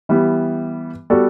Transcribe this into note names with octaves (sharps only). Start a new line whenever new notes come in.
E3 G3 B3 E4
G3 B3 F#4 A4 D5